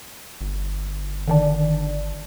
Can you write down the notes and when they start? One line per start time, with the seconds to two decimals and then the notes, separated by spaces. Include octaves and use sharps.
0.41 G1
1.28 D3 D#3 D4